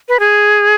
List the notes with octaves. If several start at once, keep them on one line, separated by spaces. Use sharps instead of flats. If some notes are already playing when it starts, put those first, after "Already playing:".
B4
G#4